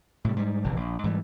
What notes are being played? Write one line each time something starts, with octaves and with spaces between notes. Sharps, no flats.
A2 C3 G3
G#2 G3
F1 A#1 C3 E3
A#1
G#2 E3 G3